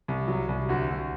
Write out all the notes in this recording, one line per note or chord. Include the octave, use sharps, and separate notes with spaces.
C2
F#3
C2
D2 F#4
D2